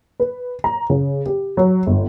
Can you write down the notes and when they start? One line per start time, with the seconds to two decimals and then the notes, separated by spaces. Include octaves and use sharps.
0.20 B4
0.64 A#5
0.90 C#3
1.26 G4
1.57 F#3
1.87 G1